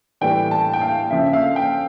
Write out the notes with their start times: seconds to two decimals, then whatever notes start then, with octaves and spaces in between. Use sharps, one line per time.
0.21 A2 E3 G3 G5
0.51 A5
0.74 G5
0.81 F5
1.10 C#3 F3 E5
1.27 E5
1.33 F5
1.56 G5